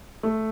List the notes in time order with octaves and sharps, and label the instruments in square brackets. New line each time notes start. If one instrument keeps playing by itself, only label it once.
[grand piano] A3